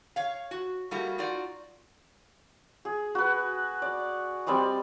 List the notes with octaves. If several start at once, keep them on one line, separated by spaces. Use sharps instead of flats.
C#5 F5
F#4
G3 A3 A#3 F#4 G4
D#4 F4 F#4 D5
G#4
F#4 B4
D5
G3 C4 D5 D#5